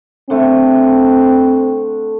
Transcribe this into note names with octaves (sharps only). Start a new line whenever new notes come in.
D3 A3 C4